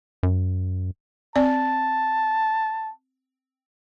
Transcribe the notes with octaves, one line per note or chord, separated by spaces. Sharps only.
F#2
C4 D5 A5